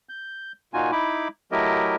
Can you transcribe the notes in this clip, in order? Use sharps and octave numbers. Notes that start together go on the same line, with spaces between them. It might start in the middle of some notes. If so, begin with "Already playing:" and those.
G6
A#2 D#4 F4 F#4 G#5
D#4 E4 B5 D6
F#3 A3 E4 G4 A#4 D#5